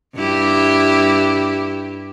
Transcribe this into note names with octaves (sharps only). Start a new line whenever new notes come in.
G2 E4 G4